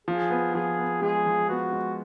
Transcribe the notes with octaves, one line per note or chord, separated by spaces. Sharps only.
F3 G#4
B3
F3 G#4
B3
G#3 G#4
F3
B3 F#4
G#3